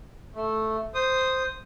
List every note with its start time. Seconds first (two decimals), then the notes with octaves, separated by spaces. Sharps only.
0.35 A3
0.95 C5 D#6